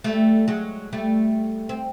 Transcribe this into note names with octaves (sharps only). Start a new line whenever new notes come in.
G3 A3
F#3 G#3
G3 A3
C4